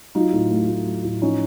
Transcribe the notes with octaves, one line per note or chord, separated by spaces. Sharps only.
F#3 D#4 F4
A2
A3
A2
F#3
A2
F3 C#4 D#4